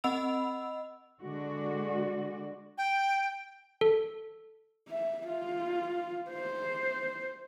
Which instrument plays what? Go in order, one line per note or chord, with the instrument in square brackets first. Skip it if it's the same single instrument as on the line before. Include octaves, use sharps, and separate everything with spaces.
[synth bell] C4 D#5 F#5 B5 E6 F7
[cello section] D3 G#3 F#4 D5
[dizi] G5
[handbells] A4
[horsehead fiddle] E5
F4
C5